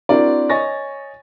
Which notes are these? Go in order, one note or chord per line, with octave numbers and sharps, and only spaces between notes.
C4 D4 E4 F#4 A#4 D5
C#5 D#5 G#5 C#6 A6 A#6